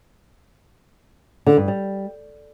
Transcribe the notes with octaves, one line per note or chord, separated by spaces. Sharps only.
D3
G2
G3